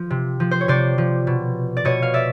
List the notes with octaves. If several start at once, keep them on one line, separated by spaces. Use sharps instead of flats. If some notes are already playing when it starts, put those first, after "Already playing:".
Already playing: F3
C3
F3
C5
C#5
C3 C5 D5
F3
B2
D5
B2 C#5 D#5
F5
D5 E5